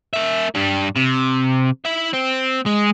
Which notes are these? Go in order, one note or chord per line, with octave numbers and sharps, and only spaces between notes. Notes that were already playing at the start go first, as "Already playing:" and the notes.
A#3 E5
G2 G3
C3
E4 E5
C4
G#3